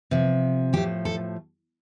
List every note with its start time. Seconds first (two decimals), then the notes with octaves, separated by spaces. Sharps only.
0.11 C3 F3
0.73 A2 F3 G4
1.05 A4